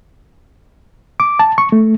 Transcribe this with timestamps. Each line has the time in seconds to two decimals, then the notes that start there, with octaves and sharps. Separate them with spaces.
1.20 D6
1.39 A5
1.58 C#6
1.72 A3